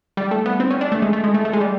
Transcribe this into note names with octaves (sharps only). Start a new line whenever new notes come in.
G3
A3
B3
C4
C#4
D4
A3
G#3
A3
G#3
A3
A3
G#3
G3